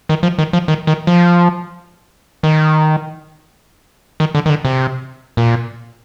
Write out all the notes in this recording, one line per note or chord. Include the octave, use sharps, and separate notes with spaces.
D#3
F3
D#3
F3
D#3
D#3
F3
D#3
D#3
D3
D#3
D3
C3
A#2